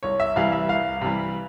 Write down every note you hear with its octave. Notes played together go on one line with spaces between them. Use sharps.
C2 C#5
E5
C3 E3 G3 F5
E5
C2 F5
C3 E3 G3